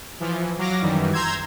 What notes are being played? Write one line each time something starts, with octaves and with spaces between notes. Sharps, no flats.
E3 F3
F#3 F5 D6 A#6
F#2 D#3 E3 G3
A#5 C6 E6 G6 G#6